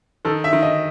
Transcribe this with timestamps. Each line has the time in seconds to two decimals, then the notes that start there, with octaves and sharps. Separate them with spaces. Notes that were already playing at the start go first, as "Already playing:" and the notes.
0.25 D#3 A4
0.44 E5
0.53 D#3
0.63 D#5